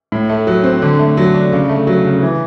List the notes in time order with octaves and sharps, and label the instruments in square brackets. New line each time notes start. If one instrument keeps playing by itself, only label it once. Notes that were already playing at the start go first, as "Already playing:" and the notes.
[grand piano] A2
A3
F#3
C4
D3
A3
F#3
D4
C#3
A3
F#3
C#3
E3